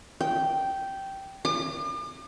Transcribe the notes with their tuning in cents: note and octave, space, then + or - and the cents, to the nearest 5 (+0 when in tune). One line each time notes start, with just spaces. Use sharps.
G5 -10
D6 +45